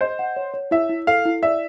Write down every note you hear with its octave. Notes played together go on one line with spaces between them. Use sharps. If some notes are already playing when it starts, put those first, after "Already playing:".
C5 D#5
F#5
C#5
C#5
E4 E5
E4
A4 F5
E4
D5 E5